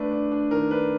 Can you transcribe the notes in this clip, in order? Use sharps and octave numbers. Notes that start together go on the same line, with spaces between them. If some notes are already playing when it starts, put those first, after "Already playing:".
Already playing: A3 D4 B4
D4
D4
D#3 A#4
D4 B4